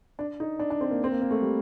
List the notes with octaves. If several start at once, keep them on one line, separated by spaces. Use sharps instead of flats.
D4
D#4
D4
D4
C4
A#3
C4
A#3
A#3
A3
G3